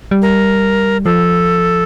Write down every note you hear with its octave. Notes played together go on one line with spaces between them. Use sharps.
G3
A#4
F3 A4